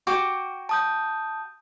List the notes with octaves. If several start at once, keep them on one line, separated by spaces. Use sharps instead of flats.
F#4 G5 D6
A5 D#6 G6